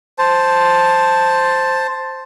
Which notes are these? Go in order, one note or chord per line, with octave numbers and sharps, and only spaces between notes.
C5 A5